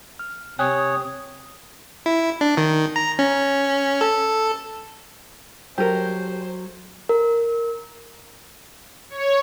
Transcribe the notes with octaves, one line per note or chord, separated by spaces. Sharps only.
F6
C3 C#5 G5 G#5 D#6 F#6
E4
D4
D#3
A#5
C#4
A4
F#3 G4 A4 A#4 C5
A#4
C#5